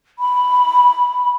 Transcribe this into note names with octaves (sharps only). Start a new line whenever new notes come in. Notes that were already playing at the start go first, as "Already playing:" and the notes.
B5